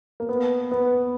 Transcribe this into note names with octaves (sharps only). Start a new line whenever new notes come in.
A#3
B3
B3